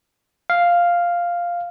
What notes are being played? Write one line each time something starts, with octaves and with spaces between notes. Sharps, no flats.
F5